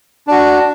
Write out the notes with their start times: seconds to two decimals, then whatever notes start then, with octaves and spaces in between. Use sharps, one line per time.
0.27 D4 F#4